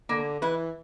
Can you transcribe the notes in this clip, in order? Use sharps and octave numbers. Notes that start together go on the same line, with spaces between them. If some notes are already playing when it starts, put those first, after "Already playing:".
D3 A#3
E3 E4 B4